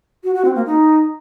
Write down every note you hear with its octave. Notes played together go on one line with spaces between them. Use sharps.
F#4
F#4
C4
A#3
D#4